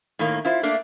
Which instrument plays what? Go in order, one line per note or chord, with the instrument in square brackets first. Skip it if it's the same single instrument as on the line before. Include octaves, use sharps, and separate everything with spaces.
[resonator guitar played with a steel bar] A2 D#3 A#3
E4 F4 C5
A3 A#3 D4